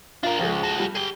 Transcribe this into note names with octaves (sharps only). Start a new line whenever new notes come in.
D4 F4 A#4
C#2 F3 G#3
F#4 A4
G3
G#4 G5